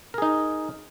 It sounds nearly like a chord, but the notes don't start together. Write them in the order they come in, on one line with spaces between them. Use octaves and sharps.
A#4 G#4 D#4